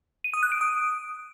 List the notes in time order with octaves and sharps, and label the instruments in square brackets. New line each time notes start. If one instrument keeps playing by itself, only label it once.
[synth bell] D#7
D#6
F#6
D7
D#6